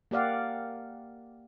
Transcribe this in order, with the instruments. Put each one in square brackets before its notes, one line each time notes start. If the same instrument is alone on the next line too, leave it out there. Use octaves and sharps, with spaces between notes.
[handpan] A#3 G4 D5 F5 F#5